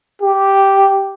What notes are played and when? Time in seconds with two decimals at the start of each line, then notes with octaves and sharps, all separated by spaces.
0.22 G4